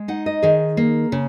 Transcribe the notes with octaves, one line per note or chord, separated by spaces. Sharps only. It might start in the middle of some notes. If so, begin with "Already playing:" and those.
Already playing: G#3
D#4 F#5
D#5
D#3 G#4
A#3
C#3